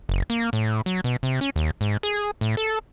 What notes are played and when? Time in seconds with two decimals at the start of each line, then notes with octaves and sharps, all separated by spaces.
0.09 F#1
0.30 A#3
0.53 A2
0.86 F#3
1.04 B2
1.23 C3
1.41 C#4
1.56 D#2
1.81 G#2
2.03 G#4
2.41 A2
2.57 A4